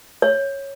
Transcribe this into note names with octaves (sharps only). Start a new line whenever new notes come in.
C#5